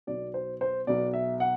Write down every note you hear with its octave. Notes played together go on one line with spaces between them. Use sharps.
B1 B2 D5
C5
C5
B1 B2 D5
E5
F#5